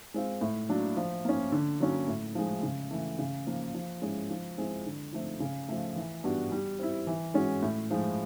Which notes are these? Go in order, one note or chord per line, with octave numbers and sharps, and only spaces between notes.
G#3 C4 F4
A2
F#3 A#3 D4
F3
A#3 C#4
D3
F#3 A#3 C#4
A2
F3 G#3
C#3
E3 A3
C#3
F3 A#3
F3
G#3 C#4 E4
F3
G#3 C4 E4
D3
F3 A3 C4 D#4
C#3
F3 A3
E3
G3 B3 D4 F#4
G3
C4 E4
E3
G#3 C#4 F#4
A2
F3 G#3